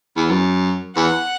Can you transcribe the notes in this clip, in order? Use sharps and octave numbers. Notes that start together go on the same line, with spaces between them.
E2
F#2
E2 F#5